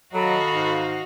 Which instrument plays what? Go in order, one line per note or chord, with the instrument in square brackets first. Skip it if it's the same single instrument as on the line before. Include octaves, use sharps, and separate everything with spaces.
[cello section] D#3 D#5 F5 [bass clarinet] F#3 [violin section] F#4 [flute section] A4 A#5 B5
[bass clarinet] G#2